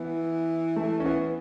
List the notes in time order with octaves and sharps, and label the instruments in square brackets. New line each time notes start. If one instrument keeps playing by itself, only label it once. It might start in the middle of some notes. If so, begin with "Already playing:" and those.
Already playing: [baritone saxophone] E3 [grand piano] B3
[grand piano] A3
C#4
B3